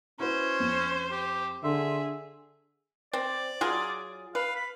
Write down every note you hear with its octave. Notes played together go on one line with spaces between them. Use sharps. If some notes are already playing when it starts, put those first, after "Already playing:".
C#4 E4 F#4 B4 C5
F2
G4
D3 G#4 E5 C6
C4 D5
F#3 F4 G#4
B4 F5
B5